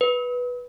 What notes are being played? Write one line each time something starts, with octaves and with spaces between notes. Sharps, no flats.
B4